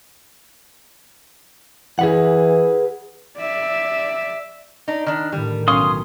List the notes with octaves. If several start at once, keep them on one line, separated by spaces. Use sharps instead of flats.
E3 G#4 B4 F#5
D5 E5
D4 D#4
D#3 D4
A2 D#3 G3
B1 C#4 F5 C6 D#6